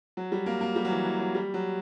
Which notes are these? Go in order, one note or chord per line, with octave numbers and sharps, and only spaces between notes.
F#3
G3
A#3
A#3
G3
F#3
E3
E3
F#3
G3
F#3